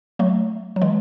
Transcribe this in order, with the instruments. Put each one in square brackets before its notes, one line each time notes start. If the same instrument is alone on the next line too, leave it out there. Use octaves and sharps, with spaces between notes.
[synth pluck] F#3 A3
F#3
E3 G#3